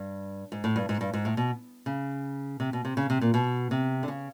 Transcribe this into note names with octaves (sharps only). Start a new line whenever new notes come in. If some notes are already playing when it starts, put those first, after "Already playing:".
Already playing: G2
G#2
A2
G2
G#2
G2
G#2
A2
B2
C#3
C3
B2
C3
C#3
C3
A#2
B2
C3
D3
C#3